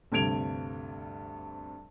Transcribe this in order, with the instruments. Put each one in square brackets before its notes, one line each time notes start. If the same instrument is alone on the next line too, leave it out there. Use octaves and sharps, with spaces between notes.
[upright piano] D2 G2 C3 G#6 D7 F7